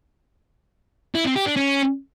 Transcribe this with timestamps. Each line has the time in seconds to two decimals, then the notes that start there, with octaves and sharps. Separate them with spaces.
1.15 E4
1.25 C4
1.36 G4
1.46 D4
1.56 C#4